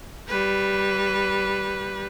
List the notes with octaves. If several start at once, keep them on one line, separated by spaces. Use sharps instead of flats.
G3 B4